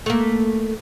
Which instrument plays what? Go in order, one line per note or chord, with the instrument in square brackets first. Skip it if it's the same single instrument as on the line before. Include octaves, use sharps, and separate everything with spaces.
[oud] A3 A#3